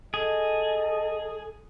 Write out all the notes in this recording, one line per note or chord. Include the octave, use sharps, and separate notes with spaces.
G#4 A4 D#5